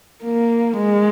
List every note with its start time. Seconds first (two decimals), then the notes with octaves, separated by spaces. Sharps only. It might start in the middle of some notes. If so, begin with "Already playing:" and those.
0.25 A#3
0.77 G#3